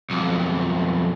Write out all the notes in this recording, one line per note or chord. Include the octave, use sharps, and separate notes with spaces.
B1 F2